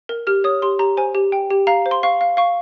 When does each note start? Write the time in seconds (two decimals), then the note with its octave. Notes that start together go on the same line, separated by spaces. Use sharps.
0.09 A#4
0.27 G4 F6
0.44 C#5 D#6
0.62 G4 C6
0.79 G4 A#5
0.97 C5 G#5
1.15 G4
1.32 G5
1.50 G4
1.67 F5 A#5
1.86 C5
1.91 C6
2.03 F5 C#6
2.21 F5
2.37 F5 C#6